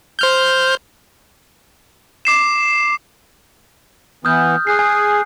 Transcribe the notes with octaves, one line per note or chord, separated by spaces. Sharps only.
C5 F6 G6
D6 C7 E7
E3 B3 D#6 F6 G6
G#4 D#6 F#6 C7
G#5